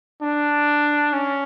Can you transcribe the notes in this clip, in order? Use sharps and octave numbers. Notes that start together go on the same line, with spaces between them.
D4
C#4